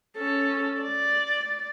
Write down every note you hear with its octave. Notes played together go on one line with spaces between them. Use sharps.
C#4 A4
D5